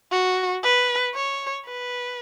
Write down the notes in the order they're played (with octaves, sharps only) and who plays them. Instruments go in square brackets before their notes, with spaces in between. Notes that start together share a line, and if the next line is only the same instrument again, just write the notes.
[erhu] F#4
B4
C#5
B4